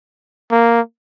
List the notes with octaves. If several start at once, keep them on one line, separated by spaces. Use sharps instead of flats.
A#3